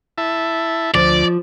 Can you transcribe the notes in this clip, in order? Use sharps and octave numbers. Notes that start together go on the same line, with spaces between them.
E4 E5 A5
D2 F3 D5